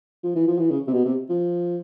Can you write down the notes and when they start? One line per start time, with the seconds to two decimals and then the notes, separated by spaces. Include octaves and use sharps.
0.24 F3
0.36 E3
0.48 F3
0.59 E3
0.71 C#3
0.87 C3
0.93 B2
1.05 C3
1.29 F3